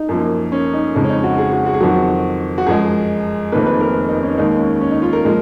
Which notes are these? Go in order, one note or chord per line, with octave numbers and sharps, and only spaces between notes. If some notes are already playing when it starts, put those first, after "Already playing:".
Already playing: D#4
F#2 F3 A#3
C#4
D#4
F2 C#3 G#3 D#4
C#4
D#4
F#4
G#4
F#4
F#4
G#4
F2 D#3 F#3 F#4
F#4
F#2 F3 G#3 G#4
F1 F2 D#3 A#3 B4
B4
A#4
D#4
C#4
D#2 D#3 G#3 D#4
C#4
C#4
D#4
F4
A#4
A#2 F3 G#3